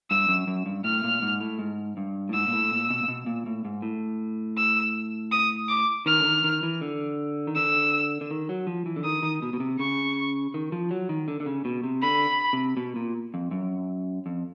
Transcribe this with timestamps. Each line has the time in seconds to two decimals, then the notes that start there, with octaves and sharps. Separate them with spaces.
0.10 G2 E6
0.28 F#2
0.47 F#2
0.66 G2
0.84 A2 F6
1.04 A#2
1.22 G#2
1.41 A2
1.59 G#2
1.97 G2
2.29 A2
2.33 G#2 E6
2.48 A#2
2.53 A2
2.71 A#2
2.90 B2
3.03 A#2
3.08 B2
3.26 A#2
3.46 A2
3.65 G#2
3.82 A2
4.57 E6
5.32 D#6
5.69 D6
6.06 D#3 F6
6.20 D3
6.24 D#3
6.44 D#3
6.63 E3
6.81 D3
7.47 D#3
7.56 D3 E6
8.21 D3
8.31 D#3
8.49 F#3
8.67 F3
8.86 E3
8.96 D3
9.04 D#3 D#6
9.23 D#3
9.42 B2
9.53 B2
9.60 C3
9.79 C#3 C#6
10.54 D#3
10.72 F3
10.91 F#3
11.09 D#3
11.28 D3
11.40 D3
11.46 C#3
11.65 B2
11.84 C3
12.02 D3 B5
12.53 C3
12.77 B2
12.96 A#2
13.34 F2
13.51 F#2
14.26 F2